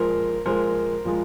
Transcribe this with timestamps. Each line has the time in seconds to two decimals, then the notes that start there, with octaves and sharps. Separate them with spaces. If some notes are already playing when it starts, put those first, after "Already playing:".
Already playing: A#2 F3 G#3 A#4 C5
0.46 A#2 F3 G#3 A#4 C5
1.05 A#2 F3 G#3